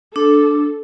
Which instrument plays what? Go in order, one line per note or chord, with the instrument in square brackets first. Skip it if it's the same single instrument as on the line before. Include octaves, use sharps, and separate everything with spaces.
[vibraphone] D4 [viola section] A4